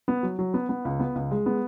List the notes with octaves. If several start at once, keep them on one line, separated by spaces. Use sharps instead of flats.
B3
F#3
F#3
B3
B3
C#2
B3
C#2
G#3
B3